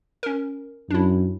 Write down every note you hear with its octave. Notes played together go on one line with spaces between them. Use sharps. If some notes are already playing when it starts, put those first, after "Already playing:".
C#4 A#4
F#2 D4 E4